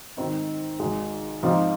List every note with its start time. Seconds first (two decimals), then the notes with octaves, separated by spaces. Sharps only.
0.17 G#2 D#3 C4 D#4
0.80 G#1 G#2 G#3
1.43 G#2 F3 C4 D#4